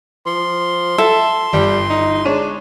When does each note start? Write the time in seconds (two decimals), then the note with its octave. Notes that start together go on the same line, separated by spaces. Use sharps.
0.26 F3 C6
0.98 A4 E5
1.53 G1 G3
1.90 D#4
2.25 G#3 D4 C#5 D#7